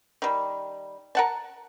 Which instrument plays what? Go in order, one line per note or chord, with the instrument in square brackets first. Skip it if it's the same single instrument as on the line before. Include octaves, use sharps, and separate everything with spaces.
[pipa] D#3 G3
A#4 F#5 A5